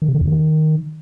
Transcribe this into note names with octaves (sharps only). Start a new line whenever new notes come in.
D#3
C3
D#3
E2
D#3